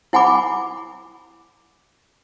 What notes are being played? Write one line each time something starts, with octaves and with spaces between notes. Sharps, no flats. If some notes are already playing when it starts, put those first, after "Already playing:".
E4 F#5 G#5 B5 D6